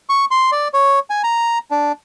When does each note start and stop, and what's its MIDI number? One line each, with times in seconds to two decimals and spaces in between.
0.09 0.25 85
0.31 0.51 84
0.52 0.68 74
0.74 0.99 73
1.10 1.22 80
1.24 1.58 82
1.71 1.92 62